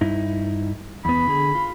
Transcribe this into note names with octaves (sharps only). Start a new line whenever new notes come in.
G2 D#4 E4
E2 B3 B5
D3 G#4
F4